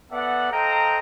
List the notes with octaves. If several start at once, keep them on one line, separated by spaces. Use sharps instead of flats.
B3 A4 D5 E5 F#5
A4 C5 D#5 F5 G5 A#5